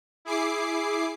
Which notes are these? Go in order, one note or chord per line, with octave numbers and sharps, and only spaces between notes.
E4 G#4 D6 C7